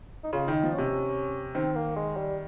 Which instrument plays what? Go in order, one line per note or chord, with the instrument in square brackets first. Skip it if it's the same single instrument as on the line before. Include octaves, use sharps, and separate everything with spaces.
[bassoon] D#4
[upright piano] C#3 [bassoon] F4
[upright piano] D#3
[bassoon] D#4
[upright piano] F3
[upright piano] C3 [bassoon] C#4
[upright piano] D#3 [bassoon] C4
[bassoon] A#3
G#3
G3